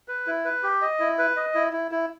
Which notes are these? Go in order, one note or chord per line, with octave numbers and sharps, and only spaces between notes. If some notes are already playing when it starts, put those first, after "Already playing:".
B4
E4
B4
G4
D#5
E4
B4
D#5
E4
E4
E4